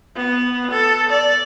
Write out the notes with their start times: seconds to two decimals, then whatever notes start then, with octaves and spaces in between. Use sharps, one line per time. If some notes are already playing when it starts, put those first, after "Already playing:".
0.16 B3
0.71 A4
1.10 D5